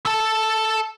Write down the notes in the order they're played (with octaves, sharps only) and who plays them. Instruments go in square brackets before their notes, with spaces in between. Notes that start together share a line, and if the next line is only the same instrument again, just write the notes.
[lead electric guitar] A4 A5